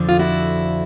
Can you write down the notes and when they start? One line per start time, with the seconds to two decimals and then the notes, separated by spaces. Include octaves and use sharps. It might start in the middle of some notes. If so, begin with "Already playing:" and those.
Already playing: F2 D3 F3
0.09 F4
0.19 E4 F#4